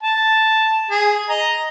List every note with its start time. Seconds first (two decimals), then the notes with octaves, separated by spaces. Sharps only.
0.03 A5
0.91 G#4
1.29 D#5 A#5